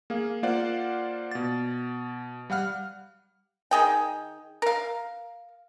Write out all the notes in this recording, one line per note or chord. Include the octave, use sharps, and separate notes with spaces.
A#3 G#4 F5
A#3 F4 C5 D5 F5 F#5
B2 A6
G3 F5 F#5 F6
D#3 G#4 G5
A#4 F5